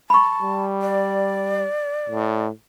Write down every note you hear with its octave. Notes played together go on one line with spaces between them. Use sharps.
A5 B5 C#6
G3
D5
A2